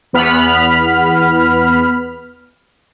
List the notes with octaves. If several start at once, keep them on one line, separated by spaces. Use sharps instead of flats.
E2 B3 B5 F6